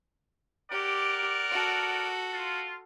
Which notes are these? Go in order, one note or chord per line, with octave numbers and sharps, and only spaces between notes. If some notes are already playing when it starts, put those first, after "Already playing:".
G4 A#4 D5 F#5
F#4 A4
F4